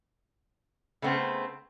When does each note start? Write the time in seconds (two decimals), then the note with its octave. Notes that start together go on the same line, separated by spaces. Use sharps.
1.02 C#3 A3 B3 C4